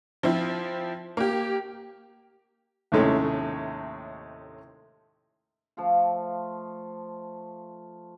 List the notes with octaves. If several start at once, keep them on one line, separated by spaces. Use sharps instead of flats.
F3 C4 E4
A#3 G4
D#2 A2 C3 G#3 A3 C#4
F3 A3 F4